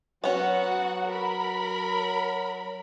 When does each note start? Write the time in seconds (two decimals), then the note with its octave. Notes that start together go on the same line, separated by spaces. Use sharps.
0.24 F#3 B3 C#4 F#4 F#5
1.07 A#4 B5